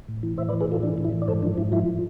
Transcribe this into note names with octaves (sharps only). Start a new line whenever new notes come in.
A2
E3
A2 C5 E5
B4 D5
E3
G#4 B4
A2 F4 A4
E3 D4
A2
E4
E3
D5
G#2 A4 C5
F3 D4
G#2 E4
F3 E4